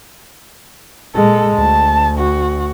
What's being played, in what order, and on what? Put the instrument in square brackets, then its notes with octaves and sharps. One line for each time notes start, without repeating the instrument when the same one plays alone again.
[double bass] A#2 G#3 [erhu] A4
[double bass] D2 [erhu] A5
[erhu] F#4